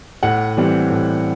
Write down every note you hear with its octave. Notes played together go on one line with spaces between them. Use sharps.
A2 F#5
E3 G3 C4
A2